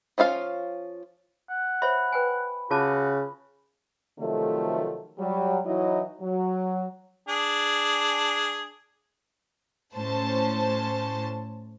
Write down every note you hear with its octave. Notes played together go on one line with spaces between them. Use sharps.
F3 C#4 F4 F5
F#5
C5 C#5 E5 B5
B4 G5 G#5
C#3 F4 F#4 A5 D6
C3 D#3 F3 F#3 A3
F#3 G3
E3 F#3 D#4 E4 C#5 D#5
F#3
D4 G#4
A2 C#4 C5 A5